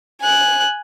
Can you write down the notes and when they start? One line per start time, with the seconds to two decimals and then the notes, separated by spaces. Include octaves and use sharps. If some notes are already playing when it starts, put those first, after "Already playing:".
0.21 G#5 F#6